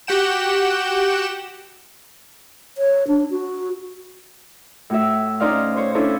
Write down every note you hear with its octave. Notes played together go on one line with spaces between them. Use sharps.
F#4 G4 F#5 G5 E7
C#5
D4
F#4
A2 F#4 E5
C#4 D#4 C5 D5 F5 F6
C5 C#5
C#4 D4 E4 A4 C5 C#5